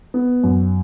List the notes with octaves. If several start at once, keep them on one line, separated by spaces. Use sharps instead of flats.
B3
F#2